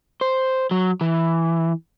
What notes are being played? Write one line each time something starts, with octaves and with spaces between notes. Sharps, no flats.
C5
F#3
E3